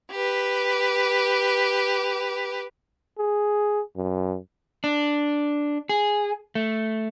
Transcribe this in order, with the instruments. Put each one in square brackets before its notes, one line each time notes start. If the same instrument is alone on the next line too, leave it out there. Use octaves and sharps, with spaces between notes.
[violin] G4 B4
[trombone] G#4
F#2
[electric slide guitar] D4
G#4
A3